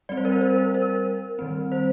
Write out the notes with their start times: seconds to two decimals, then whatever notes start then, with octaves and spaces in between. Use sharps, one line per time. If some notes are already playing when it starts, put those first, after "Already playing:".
0.09 G3 C4 D5
0.17 C5
0.25 A#4
0.32 C5
0.42 A#4
0.58 C5
0.75 A#4
1.39 D#3 G3 C4
1.72 C5